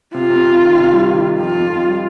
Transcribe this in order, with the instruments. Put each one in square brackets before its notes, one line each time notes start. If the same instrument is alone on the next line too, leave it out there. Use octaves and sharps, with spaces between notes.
[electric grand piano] C3 [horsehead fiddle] F4
[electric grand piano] C3
C3
D#3
C3
G3
D#3
D#3
[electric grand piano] F2 [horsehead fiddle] F4
[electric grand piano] F2
F2
G3